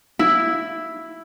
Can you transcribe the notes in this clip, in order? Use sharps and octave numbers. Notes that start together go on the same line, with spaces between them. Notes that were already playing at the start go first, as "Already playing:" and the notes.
E4